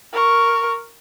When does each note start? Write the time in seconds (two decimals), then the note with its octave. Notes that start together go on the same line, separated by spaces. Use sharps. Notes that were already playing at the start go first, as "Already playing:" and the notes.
0.13 A#4 C#6